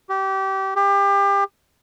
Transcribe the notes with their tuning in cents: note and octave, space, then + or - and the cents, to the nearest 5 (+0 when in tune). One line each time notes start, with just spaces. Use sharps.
G4 -25
G4 +30